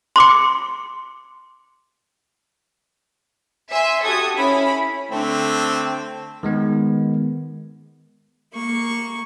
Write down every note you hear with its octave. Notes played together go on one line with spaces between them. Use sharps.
C6 D6 C#7
E5 G#5 C6
F#4 G4 A4 D#6 G#6
C#4 E4 B5
D3 A3 C4
D#3 G#3 B3
A#3 C#6